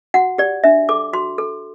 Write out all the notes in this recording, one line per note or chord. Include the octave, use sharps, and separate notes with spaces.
F#4 F#5
G4 D5
D4 E5
A4 D6
F#4 C6
A4